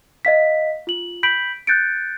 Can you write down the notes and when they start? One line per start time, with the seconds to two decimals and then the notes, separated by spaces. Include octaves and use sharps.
0.25 D#5 F5 B6
0.87 F4 F#7
1.23 B5 G6 B6 D7 F#7
1.67 F#6 G6 A6 C#7 D7